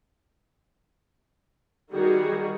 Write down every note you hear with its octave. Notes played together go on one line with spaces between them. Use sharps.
D#3 G3 F#4 G#4